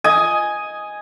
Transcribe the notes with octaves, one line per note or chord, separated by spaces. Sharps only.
D#5 G#5